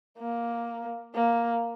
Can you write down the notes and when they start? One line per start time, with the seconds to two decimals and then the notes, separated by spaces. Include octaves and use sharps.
0.18 A#3
1.14 A#3